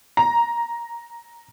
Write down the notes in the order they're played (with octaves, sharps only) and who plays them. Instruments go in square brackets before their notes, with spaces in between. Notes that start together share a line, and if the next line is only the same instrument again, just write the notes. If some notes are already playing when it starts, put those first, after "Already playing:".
[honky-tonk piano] A#5